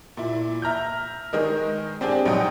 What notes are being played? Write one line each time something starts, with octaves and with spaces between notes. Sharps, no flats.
A#2 E4
E5 A#5 F6 G6
D#3 G#3 D#4 A#4
C4 D4 G4 G#4
A#1 F#3 D#4 G5 D#6